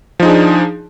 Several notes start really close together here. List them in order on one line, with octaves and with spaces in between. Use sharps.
F3 D#4 G#4 D4